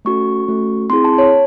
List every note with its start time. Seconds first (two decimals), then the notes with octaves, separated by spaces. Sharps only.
0.05 A3 C#4 F#4 A4 C#6
0.48 A3 C#4 F#4 A4
0.90 C4 E4 G#4 C6
1.04 A5
1.18 C#5